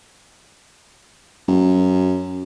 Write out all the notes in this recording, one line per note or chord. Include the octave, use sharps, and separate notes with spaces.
F#2